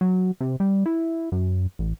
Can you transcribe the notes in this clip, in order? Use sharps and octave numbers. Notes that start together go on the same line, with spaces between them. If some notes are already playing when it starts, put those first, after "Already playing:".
F#3
C3
G3
E4
F#2
A1